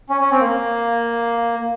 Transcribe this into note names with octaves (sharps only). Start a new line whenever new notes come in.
C#4
C#4
C4
A#3